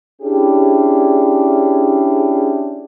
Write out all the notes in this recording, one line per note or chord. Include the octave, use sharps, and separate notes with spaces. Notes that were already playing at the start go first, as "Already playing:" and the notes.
C#4 D4 E4 G4 G#4